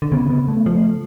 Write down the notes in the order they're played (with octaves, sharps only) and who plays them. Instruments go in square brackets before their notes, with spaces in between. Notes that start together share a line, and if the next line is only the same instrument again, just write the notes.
[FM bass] D3
[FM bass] C#3 [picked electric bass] B3
[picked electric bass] B3
A3
[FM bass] F3 [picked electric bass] A3